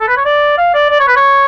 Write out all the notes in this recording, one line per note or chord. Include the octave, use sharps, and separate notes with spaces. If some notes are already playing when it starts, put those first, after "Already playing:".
A4
B4
C#5
D5
F5
D5
D5
C#5
B4
C#5